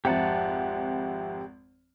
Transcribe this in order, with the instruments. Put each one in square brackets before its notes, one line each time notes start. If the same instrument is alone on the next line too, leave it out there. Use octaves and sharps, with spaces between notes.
[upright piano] G#1 F2 [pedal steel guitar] G4 F#5 A5 [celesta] C5 E5 A#5